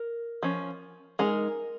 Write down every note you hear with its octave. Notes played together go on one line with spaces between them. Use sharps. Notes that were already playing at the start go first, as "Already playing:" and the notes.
Already playing: A#4
F3 C#4
G#3 D#4 A#4